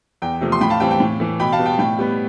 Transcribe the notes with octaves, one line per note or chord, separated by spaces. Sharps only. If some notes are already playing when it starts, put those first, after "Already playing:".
E2 G5
C3 F3 A3
C6
A2 G5 B5
F5 A5
E3 G3 C4 G5
G5
A2
E3 A3
B2 G5 B5
F5 A5
G3 B3
G5
A2 G5
G3 B3